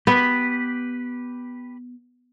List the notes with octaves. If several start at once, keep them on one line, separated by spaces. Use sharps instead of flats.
B3 G4 B4